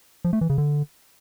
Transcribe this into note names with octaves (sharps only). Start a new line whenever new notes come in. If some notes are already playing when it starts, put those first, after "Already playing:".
F3
A3
E3
C#3
D3